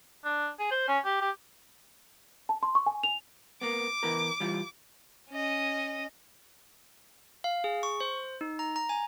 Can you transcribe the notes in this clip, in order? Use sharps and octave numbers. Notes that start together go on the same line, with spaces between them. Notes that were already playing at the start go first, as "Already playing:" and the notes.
D4
G#4
C5
C#4
G4
G4
A5
C6
C#6
G#5
F7
A#3 B3 D6
E3 B3 A#4
E3 G3 F4
C#4 D#5
F5
G#4
C#6
C5
D#4
A#5
A#5
G#5